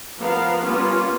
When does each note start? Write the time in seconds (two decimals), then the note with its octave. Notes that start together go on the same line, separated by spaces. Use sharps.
0.19 F3 B3 A#4 F5
0.65 G3 A#3 B3 C#4 F4